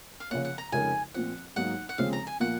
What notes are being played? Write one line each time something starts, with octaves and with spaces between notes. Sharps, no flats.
F5
C#3 F3 A#3 C#4 F#5
F#5
A#5
F2 C#3 G#3 D#4 A#4 G#5
A#2 F3 C4 F#5
G#2 F#3 A#3 D#4 F#5
F#5
D#2 C#3 F3 G#3 C4 F5
A#5
G#5
A#2 F3 A#3 F#5